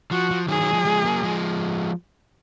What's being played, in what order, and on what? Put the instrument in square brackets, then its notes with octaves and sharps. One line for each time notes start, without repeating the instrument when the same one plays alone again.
[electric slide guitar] F3 [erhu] F#4
[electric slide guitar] F3
[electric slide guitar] D#3 F#3 [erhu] G#4
[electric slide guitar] D#3 F#3
F3 G#3
F#3
F3 G#3
F#3 A#3
F3 G#3